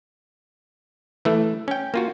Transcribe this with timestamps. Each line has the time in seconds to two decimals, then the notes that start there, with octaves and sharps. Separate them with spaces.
1.25 E3 A3
1.68 C#4 G5
1.94 A#3 F4 F#4